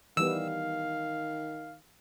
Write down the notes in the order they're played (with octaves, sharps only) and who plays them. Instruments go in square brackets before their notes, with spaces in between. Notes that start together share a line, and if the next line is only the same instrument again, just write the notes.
[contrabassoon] D#3 [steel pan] E3 G3 B3 [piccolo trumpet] F5 [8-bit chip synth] E6